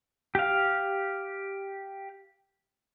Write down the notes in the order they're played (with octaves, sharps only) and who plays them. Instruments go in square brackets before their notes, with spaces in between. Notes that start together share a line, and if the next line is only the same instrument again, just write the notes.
[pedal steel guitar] G4 F5